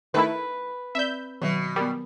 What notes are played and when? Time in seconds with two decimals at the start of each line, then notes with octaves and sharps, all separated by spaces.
0.14 D#3 A3 E4 B4
0.95 C4 D5 E5 G6
1.42 B2 D#3 F#3
1.76 G3 B3 A#4